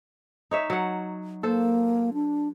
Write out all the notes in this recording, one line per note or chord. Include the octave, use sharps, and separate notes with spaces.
D#4 C#5 E5
F#3 F#5
A#3 A4 C5
D4